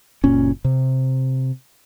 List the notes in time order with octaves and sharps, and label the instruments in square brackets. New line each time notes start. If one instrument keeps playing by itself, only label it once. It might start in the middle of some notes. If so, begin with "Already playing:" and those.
[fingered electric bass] F#1 A#2 C#4
C3